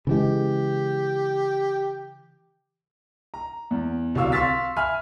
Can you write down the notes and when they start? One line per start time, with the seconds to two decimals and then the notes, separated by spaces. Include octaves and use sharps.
0.07 C#3 E3 G#3 G4
3.34 A#5
3.71 E2
4.15 D1 C2 F#3 F5 C#6 E6
4.32 F5 C6 C#6 E6 A6 B6
4.76 E5 G#5 B5 F6